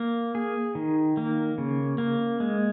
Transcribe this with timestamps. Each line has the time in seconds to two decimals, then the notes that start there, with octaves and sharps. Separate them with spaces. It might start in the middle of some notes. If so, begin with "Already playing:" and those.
Already playing: A#3
0.35 G#4
0.75 D#3
1.17 A#3
1.58 C#3
1.98 A#3
2.40 G#3